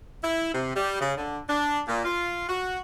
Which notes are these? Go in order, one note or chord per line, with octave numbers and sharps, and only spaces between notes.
E4
C3
G3
C#3
D3
D4
A#2
F4
F#4